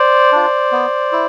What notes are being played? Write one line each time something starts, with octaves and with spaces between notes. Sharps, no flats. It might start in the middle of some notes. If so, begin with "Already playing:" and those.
Already playing: C5 D5
D4 F4
B3
E4